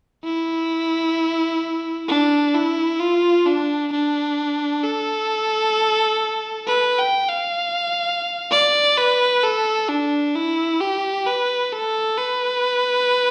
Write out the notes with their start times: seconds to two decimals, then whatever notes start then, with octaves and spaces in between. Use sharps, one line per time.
0.24 E4
2.08 D4
2.54 E4
3.00 F4
3.46 D4
3.92 D4
4.84 A4
6.67 B4
6.99 G5
7.29 F5
8.51 D5
8.97 B4
9.43 A4
9.89 D4
10.35 E4
10.81 G4
11.27 B4
11.72 A4
12.18 B4